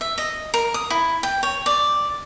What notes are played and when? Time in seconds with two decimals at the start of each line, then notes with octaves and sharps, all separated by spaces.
0.01 E5
0.18 D#5
0.54 A#4
0.74 D#6
0.90 E4
1.23 G5
1.43 C#5
1.66 D5